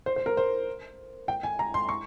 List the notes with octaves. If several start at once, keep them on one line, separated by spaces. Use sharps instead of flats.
C5
C5
A#4
C5
G5
G#5
A#5
C6
C#6